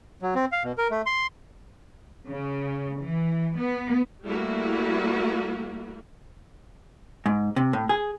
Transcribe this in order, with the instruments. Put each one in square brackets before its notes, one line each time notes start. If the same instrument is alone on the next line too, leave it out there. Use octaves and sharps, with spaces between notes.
[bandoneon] F#3
C4
F5
B2
A#4
A3
C6
[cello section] C#3
E3
B3
[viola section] G3 A3 A#3 E4 F#4
[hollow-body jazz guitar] G#2
C3
A2
G#4